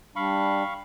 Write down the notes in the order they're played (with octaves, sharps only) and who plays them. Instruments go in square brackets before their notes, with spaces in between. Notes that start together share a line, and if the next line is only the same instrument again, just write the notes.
[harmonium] G3 D4 [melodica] F5 B5 C#6